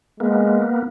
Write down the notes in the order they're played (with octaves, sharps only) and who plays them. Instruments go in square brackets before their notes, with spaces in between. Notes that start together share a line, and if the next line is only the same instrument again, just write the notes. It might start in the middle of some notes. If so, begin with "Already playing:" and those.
[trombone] G#3 [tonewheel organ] A#3 B3